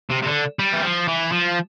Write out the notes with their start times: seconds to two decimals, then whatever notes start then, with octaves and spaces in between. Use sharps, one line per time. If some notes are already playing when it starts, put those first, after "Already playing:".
0.10 C3
0.22 C3
0.26 D3
0.59 G3
0.73 E3
0.83 F3
1.08 E3
1.32 F3